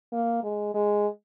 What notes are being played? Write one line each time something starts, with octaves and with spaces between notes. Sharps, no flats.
A#3
G#3
G#3